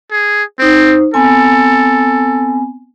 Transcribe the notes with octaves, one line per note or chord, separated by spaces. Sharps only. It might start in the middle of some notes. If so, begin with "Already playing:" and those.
G#4
C4 D#4 C5
B3 C4 A4 G#5